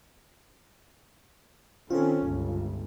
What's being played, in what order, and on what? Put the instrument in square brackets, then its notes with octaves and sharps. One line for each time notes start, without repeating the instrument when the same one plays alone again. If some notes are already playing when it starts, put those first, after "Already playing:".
[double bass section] D#3 C4 C#4 [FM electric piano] F4 A4
[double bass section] G1 C#2